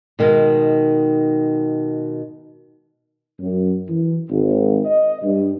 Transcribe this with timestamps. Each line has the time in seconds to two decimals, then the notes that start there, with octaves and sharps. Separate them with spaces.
0.19 B2 D#3 G#3
3.40 F#2
3.88 E3
4.30 G#1
4.86 D#5
5.22 G2